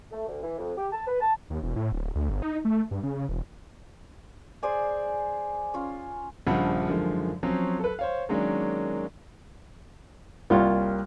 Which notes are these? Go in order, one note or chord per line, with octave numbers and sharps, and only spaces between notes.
A3
D2
E3
F2
G4
A5
B4
A5
D#2
E1
A2
D1
D2
G1
D#4
A3
G2
C#3
E1
G#4 C5 D5 G#5
C#4 F4
A#1 G2 C#3 F3 F#5 B5
F#2 D3 D#3 F3 G#3
F3 F#3 C4 C#4
A4 B4
C5 C#5 F5
D#3 F#3 G#3 A#3 C#4 D4
C2 G3 A#3 F4 C#5